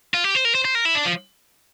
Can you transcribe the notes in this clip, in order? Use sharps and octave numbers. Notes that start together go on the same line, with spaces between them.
F4
G4
C5
A#4
C5
C5
A#4
E4
D4
F3